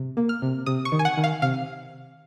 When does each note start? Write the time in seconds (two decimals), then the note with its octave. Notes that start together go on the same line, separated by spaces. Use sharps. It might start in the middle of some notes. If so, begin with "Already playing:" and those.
Already playing: C3
0.17 A#3
0.29 F6
0.42 C3
0.66 C3 D#6
0.85 C#6
0.92 D#3
0.99 G#5
1.05 F#5
1.17 D#3
1.24 F5
1.42 C3 F5